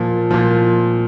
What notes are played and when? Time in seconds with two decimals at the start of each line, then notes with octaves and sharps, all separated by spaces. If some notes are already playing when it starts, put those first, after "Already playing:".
Already playing: A#2 F3
0.31 A#2 F3